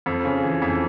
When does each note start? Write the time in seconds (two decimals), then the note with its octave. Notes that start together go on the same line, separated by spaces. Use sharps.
0.06 F2
0.25 C#3
0.43 E3
0.62 F2